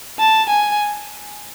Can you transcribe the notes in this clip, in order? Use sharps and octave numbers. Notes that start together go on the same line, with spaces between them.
A5
G#5